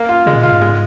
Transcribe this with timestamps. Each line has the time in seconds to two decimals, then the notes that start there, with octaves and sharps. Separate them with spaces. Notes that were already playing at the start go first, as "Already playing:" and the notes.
Already playing: A#3
0.09 F4
0.26 C#3 G#3
0.35 A#2
0.43 C#3 F4
0.52 G#2
0.62 G#3